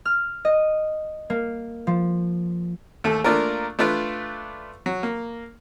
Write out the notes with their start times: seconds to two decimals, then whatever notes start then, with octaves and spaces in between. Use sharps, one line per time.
0.05 F6
0.45 D#5
1.30 A#3
1.87 F3
3.04 D#2 A3 A4
3.24 A3 A#3 D4 F4 A#4
3.79 A3 D4 F4 B4 D5
4.86 F#3
5.03 A#3